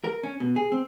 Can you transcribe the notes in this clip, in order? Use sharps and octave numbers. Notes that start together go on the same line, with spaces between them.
A#4
C#4
B2
G#4
C4